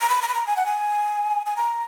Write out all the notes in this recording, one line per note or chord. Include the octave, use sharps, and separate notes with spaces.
A#5
B5
A#5
B5
A#5
G#5
F#5
G#5
G#5
A#5